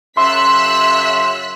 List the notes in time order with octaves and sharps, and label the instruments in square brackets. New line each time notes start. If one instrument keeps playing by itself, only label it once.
[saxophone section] F#2 C#3 E5 [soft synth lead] C6 [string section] E6 F#6 B6